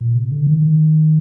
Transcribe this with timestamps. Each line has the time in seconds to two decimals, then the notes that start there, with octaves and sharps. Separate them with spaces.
0.01 A#2
0.15 C3
0.32 D3
0.47 D#3
0.61 D#3